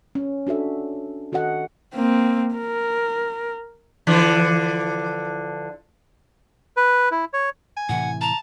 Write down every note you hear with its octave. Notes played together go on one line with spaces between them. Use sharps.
C#4
D4 F#4 A4 E5
D#3 F#4 A4 D#5 F#5
A#3 C4
A#4
D3 E3 F3
B4
E4
C#5
G#5
A2 C3 E3 F#5
A5 A#5